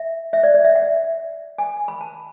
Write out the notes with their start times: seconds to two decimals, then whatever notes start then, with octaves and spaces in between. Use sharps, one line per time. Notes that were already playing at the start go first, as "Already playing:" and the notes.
Already playing: E5
0.33 E5
0.43 D5
0.54 D5
0.65 E5
0.75 F#5
1.58 G#5
1.88 B5
2.01 A5